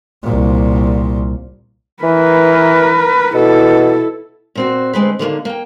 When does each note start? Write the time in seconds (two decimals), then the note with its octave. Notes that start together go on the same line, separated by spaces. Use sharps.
0.23 C2 A#2
2.03 E3 A#4 B4
3.35 B2 E4 A4
4.55 A#2 C4 F#4
4.93 D2 G#3 C4 B4
5.19 D3 D#3 G#3 A#3
5.45 A#3 G5